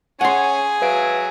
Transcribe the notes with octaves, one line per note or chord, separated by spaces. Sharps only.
C#4 G#4 C#5 F#5 C6
F#3 B4 E5 F5 D7